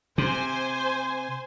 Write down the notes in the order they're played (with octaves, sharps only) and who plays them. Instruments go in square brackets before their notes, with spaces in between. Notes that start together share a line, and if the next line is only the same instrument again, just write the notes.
[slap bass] C3 [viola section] C5 G#5